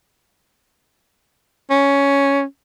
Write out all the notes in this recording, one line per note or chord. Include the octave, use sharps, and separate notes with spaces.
C#4